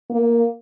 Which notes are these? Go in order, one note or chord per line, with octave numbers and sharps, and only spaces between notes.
A#3